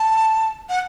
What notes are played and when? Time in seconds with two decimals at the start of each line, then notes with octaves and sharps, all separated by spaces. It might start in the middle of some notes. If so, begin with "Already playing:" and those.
Already playing: A5
0.69 F#5